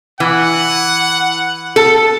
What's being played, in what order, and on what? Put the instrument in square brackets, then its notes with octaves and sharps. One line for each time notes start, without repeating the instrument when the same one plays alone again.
[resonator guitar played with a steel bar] E3 [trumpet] F#5
[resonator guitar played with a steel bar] A4